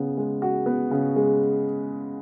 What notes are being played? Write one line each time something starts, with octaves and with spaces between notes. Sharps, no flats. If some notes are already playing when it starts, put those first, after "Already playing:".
Already playing: C#3 B3
G#3
F#4
B3
C#3
G#3